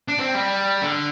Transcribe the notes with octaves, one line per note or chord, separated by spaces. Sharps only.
D4
C4
G3
D3